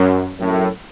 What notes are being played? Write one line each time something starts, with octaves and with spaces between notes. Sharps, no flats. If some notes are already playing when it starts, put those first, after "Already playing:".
Already playing: F#2
F#2 A2